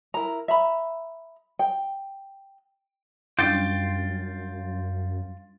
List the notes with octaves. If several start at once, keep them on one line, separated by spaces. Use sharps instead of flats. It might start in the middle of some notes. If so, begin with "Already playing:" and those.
E4 A#4 A#5
E5 A#5 B5
G5
F#2 G3 C#4 D4 F4 G5 A6 D7